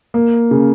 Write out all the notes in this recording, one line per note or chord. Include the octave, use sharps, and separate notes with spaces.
A#3
C#3